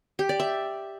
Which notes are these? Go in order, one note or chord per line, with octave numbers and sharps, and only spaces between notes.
G4
D5
E5